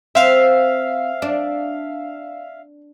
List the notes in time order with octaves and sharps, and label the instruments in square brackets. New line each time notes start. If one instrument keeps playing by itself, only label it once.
[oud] C4 [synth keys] E5 F5
[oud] D4